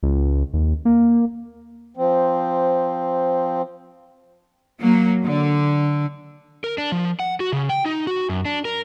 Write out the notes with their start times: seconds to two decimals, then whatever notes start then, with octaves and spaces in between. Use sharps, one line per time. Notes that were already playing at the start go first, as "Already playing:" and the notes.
0.03 C#2
0.54 D#2
0.85 A#3
1.97 F3 C4
4.80 F#3 A#3
5.26 D3
6.64 A#4
6.78 D4
6.92 F3
7.20 F#5
7.40 F#4
7.53 C#3
7.69 G5
7.85 D#4
8.07 F#4
8.29 F#2
8.45 D4
8.65 A#4